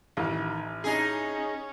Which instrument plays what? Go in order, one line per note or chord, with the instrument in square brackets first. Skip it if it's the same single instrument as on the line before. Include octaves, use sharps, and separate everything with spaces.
[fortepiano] A1 [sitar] D#3
[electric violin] C#4 [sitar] D#4 G#4